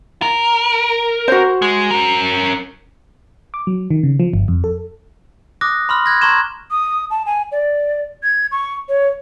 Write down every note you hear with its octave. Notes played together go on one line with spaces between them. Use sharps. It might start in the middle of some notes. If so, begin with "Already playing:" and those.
A#4
F#4 C5
G#3
C#4 A#4
D6
F#3
D#3
C#3
F3
G1
F2
A4
D6 D#6 F#6 A#6
B5 C6 F6
F#6 G#6 A#6
A#5 C6 C#6 G#6 E7
D#6
A5
G#5
D5
G#6
C#6
C#5